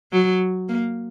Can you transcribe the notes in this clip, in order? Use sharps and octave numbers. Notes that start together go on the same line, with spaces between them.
F#3
A#3